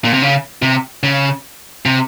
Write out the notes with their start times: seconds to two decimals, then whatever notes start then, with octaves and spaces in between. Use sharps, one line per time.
0.05 A#2
0.13 C3
0.22 C#3
0.62 C3
1.03 C#3
1.86 C3